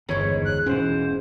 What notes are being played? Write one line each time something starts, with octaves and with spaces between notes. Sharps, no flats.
G1 E2 G#2 D#3 C#5 B5
F#6
E1 E3 C#4 C5